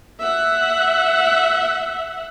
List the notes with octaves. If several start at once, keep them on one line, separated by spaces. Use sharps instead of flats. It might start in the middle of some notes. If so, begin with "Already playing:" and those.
E5 F#5